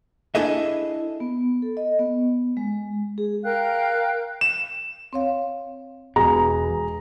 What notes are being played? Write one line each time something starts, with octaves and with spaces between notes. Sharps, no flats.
D4 E4 G#4 A4 D#5 E5
B3
A4
D#5
B3
G#3
G#4
A#4 F5 G5 F#6
E7
C4 C#5 F5
E1 B2 G#4 A#5